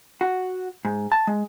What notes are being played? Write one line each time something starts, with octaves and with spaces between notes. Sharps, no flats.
F#4
G#2
A5
G#3